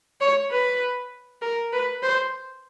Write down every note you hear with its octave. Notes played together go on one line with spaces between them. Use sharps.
C#5
B4
A#4
B4
C5